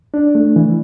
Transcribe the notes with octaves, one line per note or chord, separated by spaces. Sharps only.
D4
A3
E3